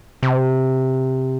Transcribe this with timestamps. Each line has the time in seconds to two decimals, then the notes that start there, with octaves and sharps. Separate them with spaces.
0.23 C3